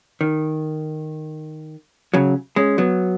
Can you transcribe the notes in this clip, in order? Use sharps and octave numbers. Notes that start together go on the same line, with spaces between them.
D#3
C#3 F#3
G#3 C#4
F#3 B3